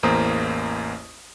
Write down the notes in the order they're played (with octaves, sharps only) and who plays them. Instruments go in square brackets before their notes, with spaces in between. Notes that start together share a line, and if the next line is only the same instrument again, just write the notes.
[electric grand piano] A1 E2 A#3 C5 A#5 D#6